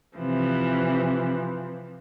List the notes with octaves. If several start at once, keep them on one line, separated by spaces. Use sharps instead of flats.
C3 E3 F3